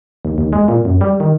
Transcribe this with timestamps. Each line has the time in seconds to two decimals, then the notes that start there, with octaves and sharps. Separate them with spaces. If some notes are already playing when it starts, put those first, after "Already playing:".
0.25 D#2
0.38 D#2
0.53 G#3
0.68 A#2
0.85 F#2
1.01 G3
1.20 D#3